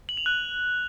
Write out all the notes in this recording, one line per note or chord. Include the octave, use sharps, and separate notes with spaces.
F#7
F7
F#6